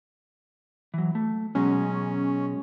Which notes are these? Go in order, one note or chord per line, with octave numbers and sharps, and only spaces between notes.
E3 F#3
A3
B2 F#3 G#3 C#4